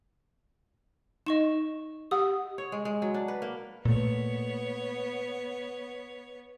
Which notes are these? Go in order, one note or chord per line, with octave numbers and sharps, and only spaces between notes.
D#4 D#5 C#6 E7
G4 F#5 D#6
C#5
G#3
G#3
F#3
D4
B4
A#3
A#2 A3 B3 C#5